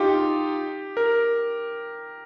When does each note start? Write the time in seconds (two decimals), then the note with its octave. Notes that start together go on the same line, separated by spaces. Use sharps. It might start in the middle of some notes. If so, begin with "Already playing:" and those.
Already playing: D#4 F4 G4
0.97 A#4